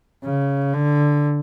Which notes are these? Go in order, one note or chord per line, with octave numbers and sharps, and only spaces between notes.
C#3
D3